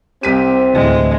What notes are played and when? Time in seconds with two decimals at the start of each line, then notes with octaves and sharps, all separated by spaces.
0.23 C2 C4 G4 B6 D#7
0.74 D2 A2 E3 G#3